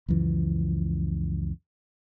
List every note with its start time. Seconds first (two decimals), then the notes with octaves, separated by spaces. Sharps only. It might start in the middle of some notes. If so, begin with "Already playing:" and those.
0.08 C#2 F#2 E3 F3